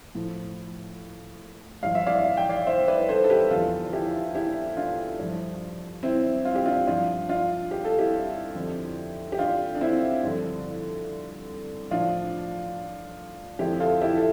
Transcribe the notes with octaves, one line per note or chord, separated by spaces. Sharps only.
A2 F3
G2 F3 F5
E5
D5 F5
F5
G5
D5 F5
C5 E5
B4 D5
A4 C5
A4
G4 B4
E2 D3 F3 F4 A4
E4 G4
E4 G4
D4 F4
G2 F3
C4 E4
F4
G4
D4 F4
G2 F3 D4 F4
D4 F4
G4
A4
E4 G4
F2 D3 F3
G4
D4 F4
D4
C4 E4
G2 D3 F3
A2 F3 D4 F4
F2 D3 F3 E4 G4
F4 A4
E4 G4
A4